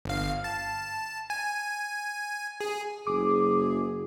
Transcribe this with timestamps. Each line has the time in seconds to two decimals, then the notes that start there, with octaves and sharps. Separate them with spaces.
0.05 G1 F5
0.44 A5
1.30 G#5
2.61 G#4
3.07 F#1 G#4 D6